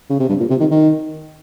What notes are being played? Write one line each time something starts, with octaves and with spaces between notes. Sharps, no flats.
C#3
C3
G2
A#2
C3
D#3
D#3